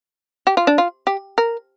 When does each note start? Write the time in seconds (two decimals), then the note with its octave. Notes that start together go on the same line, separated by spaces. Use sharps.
0.47 G4
0.57 F4
0.67 D4
0.78 F4
1.07 G4
1.38 A#4